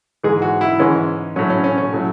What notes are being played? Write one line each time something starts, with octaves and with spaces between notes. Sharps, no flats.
G#2 E3 G#3 G#4
F#4
E4
G#2 E3 G#3 C#4
A2 F#3 C#4
C#4
C#4
C#4
A2 F#3